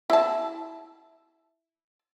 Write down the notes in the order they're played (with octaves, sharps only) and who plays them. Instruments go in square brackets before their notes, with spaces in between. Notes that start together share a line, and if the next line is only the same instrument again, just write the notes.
[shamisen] E4 A5